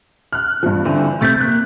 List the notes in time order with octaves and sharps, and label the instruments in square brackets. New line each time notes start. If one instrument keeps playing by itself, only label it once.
[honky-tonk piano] F6 F#6
G2 F3
[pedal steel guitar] D3 E3 C4
[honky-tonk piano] C3 A6 B6 [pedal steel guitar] A3 G6
[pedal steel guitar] A#3 F#6